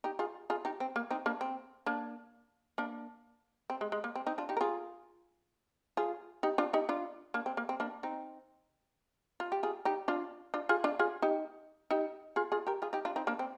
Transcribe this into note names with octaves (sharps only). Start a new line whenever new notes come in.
D#4 G4
F4 G#4
F4 G#4
D#4 G4
C4
A#3
C4 D#4
A#3 D4
C4
A#3 D4
A#3 D4
C4
G#3
G#3
A#3
C4
C4 D#4
D4 F4
D#4 G4
A#4
F4 G#4
F4 G#4
D#4 G4
D4 F4
D#4 G4
D4 F4
A#3 D4
C4
A#3
C4
A#3 D4
C4 D#4
F4
G4
F4 G#4
D#4 G4
D4 F4
D4 F4
F4 G#4
D4 F4
F4 G#4
D#4 G4
D#4 G4
F4 G#4
F4 G#4
G4 A#4
F4 G#4
D#4 G4
D4 F4
C4 D#4
A#3 D4
C4